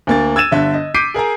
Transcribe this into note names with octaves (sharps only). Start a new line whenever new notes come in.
D2 A#3 A6
E6 G#6 A6 D#7 E7
G1 D3 E5
D#5
D6 G6 B6 C7 D7 D#7
G#4 A#4 G#5 A#5